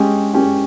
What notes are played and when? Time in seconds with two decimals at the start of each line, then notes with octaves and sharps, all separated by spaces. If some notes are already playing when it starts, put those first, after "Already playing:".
Already playing: G#3 C#4 G4
0.34 G#3 C#4 G4